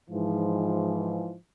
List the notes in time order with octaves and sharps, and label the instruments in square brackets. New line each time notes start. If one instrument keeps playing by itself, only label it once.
[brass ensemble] G#2 E3 F3